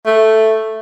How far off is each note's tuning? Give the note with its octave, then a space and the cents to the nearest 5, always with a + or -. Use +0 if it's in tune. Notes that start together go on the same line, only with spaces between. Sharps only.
A3 +0